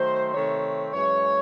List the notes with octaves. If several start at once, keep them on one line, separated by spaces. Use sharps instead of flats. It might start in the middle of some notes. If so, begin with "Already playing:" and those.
Already playing: D#3 F#3 A3 C5
C3 D#3 A3 C4 C#5
F#2 E3 G#3 C#5